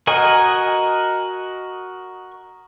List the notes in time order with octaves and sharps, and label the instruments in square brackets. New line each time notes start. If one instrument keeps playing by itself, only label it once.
[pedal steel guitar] F#4 A#4 D#5 G#5